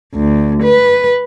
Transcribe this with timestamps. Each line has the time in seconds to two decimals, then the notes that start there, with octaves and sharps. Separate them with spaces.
0.15 D2
0.63 B4